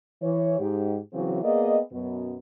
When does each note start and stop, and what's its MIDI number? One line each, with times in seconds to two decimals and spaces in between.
0.21 0.56 52
0.21 0.56 73
0.58 0.98 44
0.58 0.98 67
1.13 1.38 49
1.13 1.38 52
1.13 1.38 54
1.13 1.38 60
1.13 1.38 64
1.43 1.79 58
1.43 1.79 59
1.43 1.79 68
1.43 1.79 74
1.43 1.79 75
1.91 2.36 42
1.91 2.36 47
1.91 2.36 59